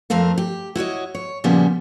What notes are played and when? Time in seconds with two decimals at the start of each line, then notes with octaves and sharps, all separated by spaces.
0.10 F2 A3 C4 A#4 F5
0.38 G4
0.75 E4 F#4 C#5 D#5
1.15 C#5
1.44 A#2 C#3 F3 G3 A#3 B3